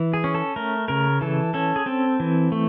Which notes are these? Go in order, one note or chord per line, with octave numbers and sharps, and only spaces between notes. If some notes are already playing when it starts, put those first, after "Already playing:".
Already playing: E3
G#4
C#4
A4
A3 A#4
C#3 A#4
E3 A4
C#4 A4
G#4
C4 A4
E3
A3